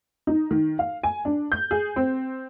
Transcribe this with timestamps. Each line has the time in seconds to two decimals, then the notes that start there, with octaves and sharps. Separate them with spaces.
0.27 D#4
0.51 D#3
0.79 F5
1.03 G#5
1.25 D4
1.52 G6
1.71 G#4
1.96 C4